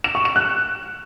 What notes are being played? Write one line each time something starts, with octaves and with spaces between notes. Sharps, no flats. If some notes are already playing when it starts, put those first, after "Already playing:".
E7
C#6
E7
F#6